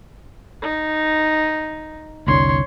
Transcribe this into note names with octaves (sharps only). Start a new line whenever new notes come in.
D#4
F1 C2 D3 C#5 C6